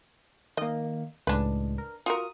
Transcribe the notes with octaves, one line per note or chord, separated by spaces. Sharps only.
D#3 A#3 D#5
C#2 A2 G#3 D4 B4
A#4
F4 F#4 A#4 D#6